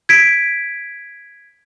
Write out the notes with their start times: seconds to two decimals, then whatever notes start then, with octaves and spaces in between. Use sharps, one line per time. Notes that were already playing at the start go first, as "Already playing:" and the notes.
0.09 G#6 B6 D7